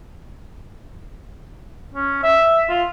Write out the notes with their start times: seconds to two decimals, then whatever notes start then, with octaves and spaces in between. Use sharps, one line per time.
1.94 C#4
2.23 E5
2.70 F4